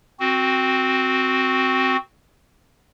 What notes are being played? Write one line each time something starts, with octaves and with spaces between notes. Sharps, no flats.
C4 F#4